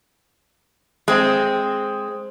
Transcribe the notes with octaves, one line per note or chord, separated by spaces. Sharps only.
G#3 C4